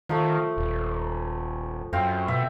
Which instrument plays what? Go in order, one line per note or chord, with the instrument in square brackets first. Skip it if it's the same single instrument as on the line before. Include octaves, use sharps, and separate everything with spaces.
[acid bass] D#3 [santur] F3 A3
[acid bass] D#1
[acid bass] F#2 [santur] C4 F5 G5
[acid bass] B2 [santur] E5